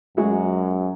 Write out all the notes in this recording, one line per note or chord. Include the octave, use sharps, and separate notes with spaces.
F#2 G#3 F#4 E5